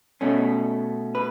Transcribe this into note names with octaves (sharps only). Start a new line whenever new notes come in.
B2 A3 C#4
B4